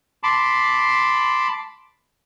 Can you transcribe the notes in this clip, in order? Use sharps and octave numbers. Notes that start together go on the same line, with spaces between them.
A5 B5 C6 D6